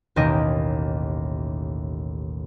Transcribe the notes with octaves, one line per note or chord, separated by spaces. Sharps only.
A1 D#2 B2 A#4 D#5 G5